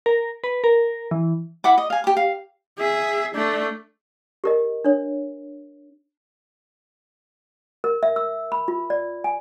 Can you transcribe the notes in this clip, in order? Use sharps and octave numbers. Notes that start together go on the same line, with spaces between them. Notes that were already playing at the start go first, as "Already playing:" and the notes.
A#4
B4
A#4
E3
E4 F#5 D6
D#5
F5 G#5
G4 D6
F5
G#4 E5
A3 D4
G4 A#4 D#5
D4 C#5
A#4
E5
E6
B5
F4
D5
G#5